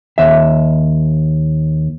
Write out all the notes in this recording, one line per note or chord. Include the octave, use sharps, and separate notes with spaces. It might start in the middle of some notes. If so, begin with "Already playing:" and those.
D#2 E5